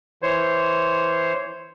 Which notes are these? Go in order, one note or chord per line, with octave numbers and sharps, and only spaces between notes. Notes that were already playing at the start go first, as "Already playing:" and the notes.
E3 C5 C#5